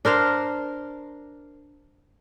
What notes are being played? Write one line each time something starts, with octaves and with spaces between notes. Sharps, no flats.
D4 A#4 C5 F5